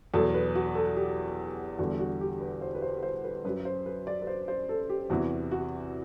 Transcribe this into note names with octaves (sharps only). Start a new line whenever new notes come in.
E2 B2 F#3 A4
B4
F#4
A4
G4
E2 D3 G3 F#4
F#4
G4
B4
C5
B4
C5
B4
C5
B4
F#2 F#3 B4
C5
B4
D5
B4
C5
C5
A4
G4
E2 C3 E3 F#4
F#4